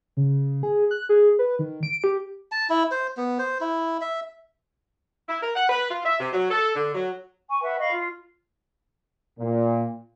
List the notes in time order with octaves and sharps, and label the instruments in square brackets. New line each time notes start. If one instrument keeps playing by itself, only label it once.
[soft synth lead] C#3
G#4
F#6
G#4
B4
D#3
D7
G4
[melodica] A5
E4
C5
B3
C5
E4
E5
[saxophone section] E4
A#4
F#5
B4
F4
E5
C3
F#3
A4
D3
F#3
[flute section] G#5 C#6
B4 E5 F#5
D#5 F5 B5 C#6
F4
[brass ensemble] A#2